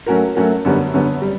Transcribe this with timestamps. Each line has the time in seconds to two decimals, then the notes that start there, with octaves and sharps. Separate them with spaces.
0.07 F#3 A3 C#4 F#4 A#4
0.35 F#3 A3 C#4 F#4 A#4
0.65 F#2 D3 G3 B3
0.94 F#2 D3 G3 B3
1.22 G3